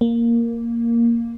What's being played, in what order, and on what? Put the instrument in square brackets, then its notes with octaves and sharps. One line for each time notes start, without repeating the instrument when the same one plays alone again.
[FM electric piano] A#3